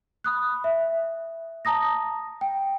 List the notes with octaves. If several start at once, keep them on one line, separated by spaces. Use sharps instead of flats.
B5 D#6 F#6
E5
A5 A#5 D#6 A#6
G5